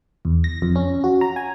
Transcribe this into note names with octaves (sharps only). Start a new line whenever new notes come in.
E2
A#6
F2
C#4
F#4
A#5
G#5